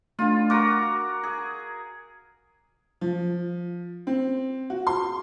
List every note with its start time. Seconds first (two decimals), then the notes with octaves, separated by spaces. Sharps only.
0.19 A3 D4 F4
0.50 F#4 A#4 A#5 D6
1.23 G#4
3.01 F3
4.07 C4
4.70 F#4
4.87 C6